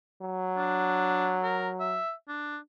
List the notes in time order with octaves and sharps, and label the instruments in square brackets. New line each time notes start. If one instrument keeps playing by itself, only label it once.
[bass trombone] F#3
[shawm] D4
A#4
E5
D4